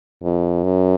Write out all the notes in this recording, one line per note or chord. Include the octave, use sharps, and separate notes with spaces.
F2
F#2